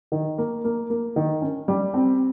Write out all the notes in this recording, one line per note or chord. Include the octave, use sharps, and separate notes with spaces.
D#3
A#3
A#3
A#3
D#3
C#4
G3
C4